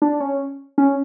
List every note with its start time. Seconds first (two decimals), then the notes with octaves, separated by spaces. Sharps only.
0.02 D4
0.20 C#4
0.78 C#4